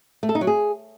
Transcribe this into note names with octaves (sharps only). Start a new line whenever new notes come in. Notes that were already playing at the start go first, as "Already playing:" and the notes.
A3
A4
D#4
F#3
G#4